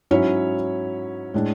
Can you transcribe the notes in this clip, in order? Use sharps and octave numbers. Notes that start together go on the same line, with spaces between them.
G#2 F#3 C#4 E4 C#5
A2 G#3 D4